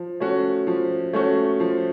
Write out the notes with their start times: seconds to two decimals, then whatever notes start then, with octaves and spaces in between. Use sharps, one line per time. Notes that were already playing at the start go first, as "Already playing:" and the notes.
Already playing: F3
0.20 A3 C#4 F#4
0.67 F3
1.13 A3 C#4 F#4
1.60 F3